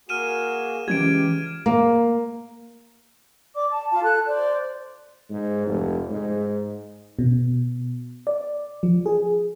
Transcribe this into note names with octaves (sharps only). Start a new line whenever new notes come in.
A#3 F#4 G#4 F6 D#7 E7
C#2 E3 G4 G#6 D7
A#3
D5 D6
A5
F4 F5 A5
A4 F#6
C5 D5
G#2
F1
G#2
B2
D5
F3
G#4